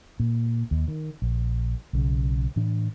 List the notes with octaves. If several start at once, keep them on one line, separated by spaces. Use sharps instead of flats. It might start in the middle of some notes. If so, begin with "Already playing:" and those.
A#2
D#2
D#3
A#1
B1 C#3
A2 E3 D4